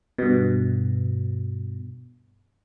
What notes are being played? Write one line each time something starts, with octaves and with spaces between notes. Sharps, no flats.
G2 B2